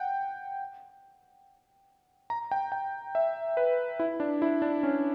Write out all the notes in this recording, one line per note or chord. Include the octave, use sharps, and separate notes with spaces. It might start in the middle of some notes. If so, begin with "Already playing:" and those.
Already playing: F#5 G5
A#5
G5
G5
E5
B4
E4
D4
E4
D4
C#4